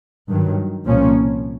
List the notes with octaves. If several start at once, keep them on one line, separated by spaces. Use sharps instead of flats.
G2 D#3 F#3
C2 A#2 F3 A#3 C#4